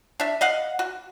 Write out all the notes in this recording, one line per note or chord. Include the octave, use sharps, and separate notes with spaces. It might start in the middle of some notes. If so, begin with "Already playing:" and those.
D4 E5
D#5 F5 F#5
F#4